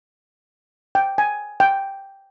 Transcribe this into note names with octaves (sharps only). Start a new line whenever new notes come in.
G5
G#5
G5